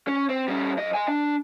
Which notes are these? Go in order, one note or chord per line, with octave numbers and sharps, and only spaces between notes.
C#4
C4
G3 C#4
F#2 D#5
D#5 G#5
D4